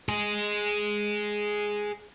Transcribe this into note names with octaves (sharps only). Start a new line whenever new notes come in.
G#4 D#5